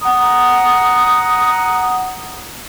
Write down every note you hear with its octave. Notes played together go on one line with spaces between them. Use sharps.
F#5 A#5 D#6